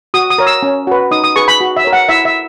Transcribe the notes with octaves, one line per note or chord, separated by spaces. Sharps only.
F#4 D#6
D#6
A#4 C#5
E6
C#4
F#4 B4
D#4 D#6
D#6
G#4 B4 C#6
B5
F#4
E5
A#4 C#5
F#5
E4 E5
E5